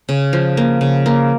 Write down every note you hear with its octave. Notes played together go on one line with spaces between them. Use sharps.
C#3
F3
A#3
C#3
A#3